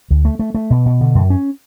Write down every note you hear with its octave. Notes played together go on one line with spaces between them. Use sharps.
D2
A3
A3
A3
B2
B2
D3
F#2
C#4